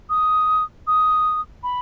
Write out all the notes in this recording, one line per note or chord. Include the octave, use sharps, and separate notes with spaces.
D#6
D#6
B5